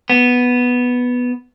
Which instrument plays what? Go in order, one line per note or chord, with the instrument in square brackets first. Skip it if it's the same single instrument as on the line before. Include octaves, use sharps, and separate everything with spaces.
[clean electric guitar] B3